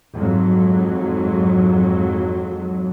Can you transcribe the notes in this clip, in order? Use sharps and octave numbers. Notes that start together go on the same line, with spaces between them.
F2 G#2 F#3